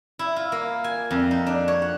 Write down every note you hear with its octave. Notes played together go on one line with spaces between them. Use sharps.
E4
F4
A#3
G#5
F2
D#4
D4
C#5
F#5